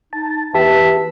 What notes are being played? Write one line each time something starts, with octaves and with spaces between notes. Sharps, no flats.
D#4 A5
E2 G4 B4 E5 A5